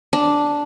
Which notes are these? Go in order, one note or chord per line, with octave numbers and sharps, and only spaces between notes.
D4